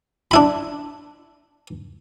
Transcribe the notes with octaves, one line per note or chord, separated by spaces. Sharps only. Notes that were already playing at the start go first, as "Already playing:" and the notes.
D4 E4 B5